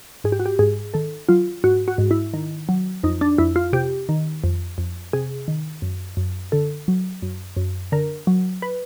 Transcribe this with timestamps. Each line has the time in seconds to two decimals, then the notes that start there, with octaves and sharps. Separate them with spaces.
0.24 G#2 G#4
0.32 G4
0.40 F#4
0.46 G4
0.59 G#2 G#4
0.94 D#3 A4
1.29 F#3 F4
1.64 G#2 F#4
1.88 F#4
1.98 G#2
2.11 E4
2.34 D#3
2.69 F#3
3.03 F2 D#4
3.21 D4
3.38 F2 E4
3.56 F4
3.73 C3 G4
4.09 D#3
4.44 F2
4.78 F2
5.13 C3 G#4
5.48 D#3
5.82 F#2
6.17 F#2
6.52 D3 A4
6.88 F#3
7.22 F#2
7.57 F#2
7.92 D3 A#4
8.27 F#3
8.62 B4